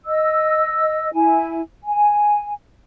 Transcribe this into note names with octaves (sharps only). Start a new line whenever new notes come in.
D#5 E6
E4 G#5
G#5